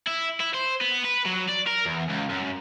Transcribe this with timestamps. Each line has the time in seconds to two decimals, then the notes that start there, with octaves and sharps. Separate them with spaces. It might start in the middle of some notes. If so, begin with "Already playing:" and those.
0.07 E4
0.40 E4
0.54 C5
0.81 B3
1.05 B4
1.26 F#3
1.49 D5
1.67 A#4
1.86 E2
2.09 C#2
2.30 F#2